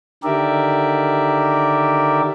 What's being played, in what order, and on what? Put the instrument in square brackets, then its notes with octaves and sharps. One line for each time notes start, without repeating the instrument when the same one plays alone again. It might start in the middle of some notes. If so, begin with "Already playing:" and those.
[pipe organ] D3 D#3 G4 A#4 D5 E5